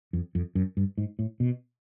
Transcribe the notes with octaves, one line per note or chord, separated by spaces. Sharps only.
F2
F2
F#2
G2
G#2
A2
B2